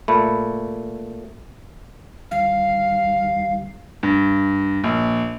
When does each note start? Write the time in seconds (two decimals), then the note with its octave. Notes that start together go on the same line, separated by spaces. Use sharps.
0.08 A#2 A3 B5
2.31 D2 D#3 G3 F5
4.03 G2
4.84 A#1